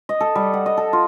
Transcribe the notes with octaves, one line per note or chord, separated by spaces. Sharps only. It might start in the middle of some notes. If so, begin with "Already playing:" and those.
D#5
A4
G3
F#5
D#5
A4
F4